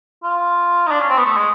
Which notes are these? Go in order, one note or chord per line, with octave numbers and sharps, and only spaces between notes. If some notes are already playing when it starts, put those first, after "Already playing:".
F4
D#4
D4
C#4
C4
B3
A3
G#3